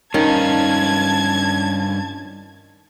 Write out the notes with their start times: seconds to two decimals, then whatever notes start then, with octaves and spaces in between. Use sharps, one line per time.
0.14 G2 D#3 F3 C#4 F4 A5 G#6